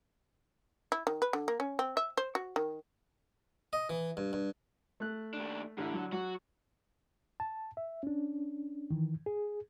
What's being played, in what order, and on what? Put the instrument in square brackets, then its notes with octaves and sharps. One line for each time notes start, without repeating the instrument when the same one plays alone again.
[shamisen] E4
D#3
B4
D3
A#3
C#4
C4
E5
C5
F#4
D#3
[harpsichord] D#5
E3
G2
G2
[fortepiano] A3 F#6
[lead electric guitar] D#2 D4
[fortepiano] A1 E4 [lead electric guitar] D3
[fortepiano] F#3
[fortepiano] F#3 C#6 [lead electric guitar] F#4
[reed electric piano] A5
E5
C#4 D4
D#3 E3
G#4